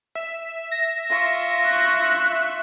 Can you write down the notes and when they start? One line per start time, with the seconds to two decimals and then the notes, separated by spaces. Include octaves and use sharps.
0.15 E5
0.71 A#6
1.09 F4 C#6
1.67 F#6